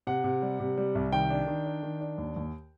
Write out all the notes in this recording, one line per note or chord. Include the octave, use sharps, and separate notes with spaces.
C3 F#5
C3
G3
C3
G3
C2
D#3 G5
D4
D#3
D4
D#3
D4
D#2
D#2